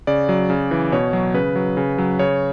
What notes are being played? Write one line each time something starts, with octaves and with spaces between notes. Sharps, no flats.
C#3 D5
F#3
C#3
E3
B2 C#5
F#3
C#3 B4
F#3
C#3
F#3
C#3 C#5